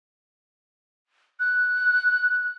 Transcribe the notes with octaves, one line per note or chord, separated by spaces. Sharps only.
F#6